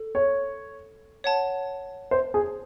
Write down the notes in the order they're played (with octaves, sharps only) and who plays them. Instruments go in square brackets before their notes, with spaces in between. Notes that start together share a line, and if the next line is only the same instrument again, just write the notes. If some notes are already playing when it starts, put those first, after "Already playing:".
Already playing: [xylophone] A4
[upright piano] C#5
[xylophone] C#5 F#5 A5
[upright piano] C5
G#4